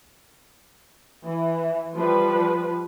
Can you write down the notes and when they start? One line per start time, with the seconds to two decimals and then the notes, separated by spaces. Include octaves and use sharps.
1.24 E3
1.97 F3 G3 B4